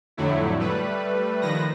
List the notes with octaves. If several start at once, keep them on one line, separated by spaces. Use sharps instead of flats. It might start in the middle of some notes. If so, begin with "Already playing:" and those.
F2 A2 D3 F#3 A3 E4
G3 A3 B4
D#3 F3 B4 A#6